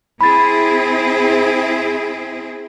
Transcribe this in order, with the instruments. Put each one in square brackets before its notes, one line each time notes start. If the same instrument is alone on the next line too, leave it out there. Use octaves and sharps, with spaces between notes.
[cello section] C4 E4 G#4 [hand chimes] B5 A6